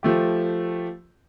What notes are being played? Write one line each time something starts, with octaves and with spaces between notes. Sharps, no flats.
F3 A3 G4